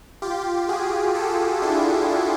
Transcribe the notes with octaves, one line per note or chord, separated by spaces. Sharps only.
F4 G4
F#4 G#4
G4 A4
D4 E4